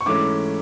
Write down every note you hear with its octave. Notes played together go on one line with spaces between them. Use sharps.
C#6
G#2 E3 A3 C#4 D6